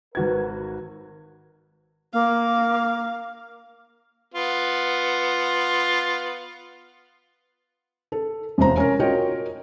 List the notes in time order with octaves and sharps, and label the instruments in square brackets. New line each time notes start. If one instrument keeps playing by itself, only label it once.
[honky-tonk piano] G#1 F#4 G#6 [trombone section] A#4 B4
[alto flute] A#3 [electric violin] F5
[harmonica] B3 F4
[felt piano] A4
E1 F2 C3 F3 C5 A#5
C#4 A#4
F4 F#4 A#4 C#5 D#5 G5